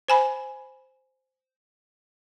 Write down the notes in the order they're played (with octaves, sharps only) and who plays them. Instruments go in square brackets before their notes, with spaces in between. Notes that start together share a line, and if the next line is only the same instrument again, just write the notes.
[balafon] C5 G#5 B5